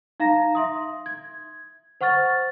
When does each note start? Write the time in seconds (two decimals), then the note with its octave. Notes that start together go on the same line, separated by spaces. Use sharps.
0.20 D#4 F5 A#5 A#6
0.55 E5 C6 D#6
1.06 G#6
2.01 C5 F#5 C#6 F6 A6